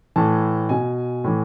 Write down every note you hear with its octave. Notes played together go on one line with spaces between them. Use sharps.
A2 E3 A5
B2 G#5
A2 E3